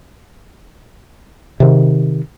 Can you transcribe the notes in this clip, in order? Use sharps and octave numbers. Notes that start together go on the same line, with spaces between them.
C3 D#3